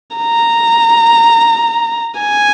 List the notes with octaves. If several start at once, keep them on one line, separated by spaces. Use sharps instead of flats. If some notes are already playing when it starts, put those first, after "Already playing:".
A#5
G#5